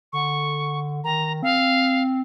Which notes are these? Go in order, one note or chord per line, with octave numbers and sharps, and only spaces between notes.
D3 C#6
D#3 A#5
C4 F5